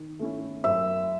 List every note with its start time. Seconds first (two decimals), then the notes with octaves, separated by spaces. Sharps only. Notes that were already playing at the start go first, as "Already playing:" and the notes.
Already playing: D#3
0.19 A3 C#4 E4
0.64 F#2 E5